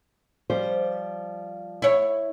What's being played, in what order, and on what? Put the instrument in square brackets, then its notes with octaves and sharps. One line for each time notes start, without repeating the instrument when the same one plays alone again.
[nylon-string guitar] F3 G3 C5
[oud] E4 C#5